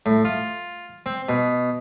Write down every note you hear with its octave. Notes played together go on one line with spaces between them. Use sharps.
A2
F4
C4
B2